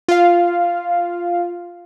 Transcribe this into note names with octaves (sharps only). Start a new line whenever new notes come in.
F4 F5